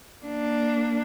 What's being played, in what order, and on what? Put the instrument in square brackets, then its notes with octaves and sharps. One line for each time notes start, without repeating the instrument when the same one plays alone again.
[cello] A#3 D4